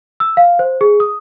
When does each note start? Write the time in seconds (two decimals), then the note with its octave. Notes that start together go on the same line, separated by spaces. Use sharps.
0.20 E6
0.37 F5
0.59 C5
0.81 G#4
1.00 D#6